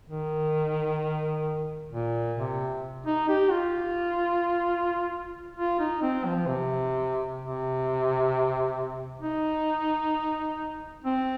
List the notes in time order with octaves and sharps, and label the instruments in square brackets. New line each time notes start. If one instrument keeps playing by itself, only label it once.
[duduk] D#3
A#2
C3
D#4
G4
F4
F4
D#4
C4
F3
C3
C3
D#4
C4